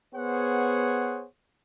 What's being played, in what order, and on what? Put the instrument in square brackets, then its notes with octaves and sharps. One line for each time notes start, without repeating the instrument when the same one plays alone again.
[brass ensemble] B3 G#4 C5 C#5 F#5